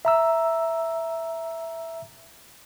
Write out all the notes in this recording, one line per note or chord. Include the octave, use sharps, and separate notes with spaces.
E5 A#5 E6